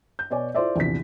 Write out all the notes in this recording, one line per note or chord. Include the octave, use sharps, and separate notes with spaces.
G6
B2 C#5 D5 G#5
E4 F4 A4 C5 D5 E5
A#1 E2 C3 B6